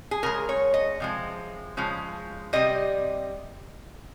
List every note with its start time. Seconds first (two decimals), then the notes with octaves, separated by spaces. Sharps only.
0.11 G#4
0.23 C#3 G#3 A#4
0.49 C#5
0.74 D#5
1.00 C3 F3 G#3
1.77 C#3 F3 G#3
2.53 C3 G3 D#5